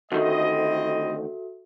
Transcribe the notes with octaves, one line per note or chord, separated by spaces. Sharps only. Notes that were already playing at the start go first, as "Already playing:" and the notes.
D2 D#3 C4 E4 F#4 A4 D#5 E5